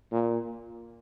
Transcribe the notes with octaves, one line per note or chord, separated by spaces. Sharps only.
A#2